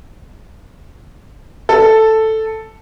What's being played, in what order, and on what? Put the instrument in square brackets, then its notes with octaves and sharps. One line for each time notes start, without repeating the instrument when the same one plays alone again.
[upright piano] A4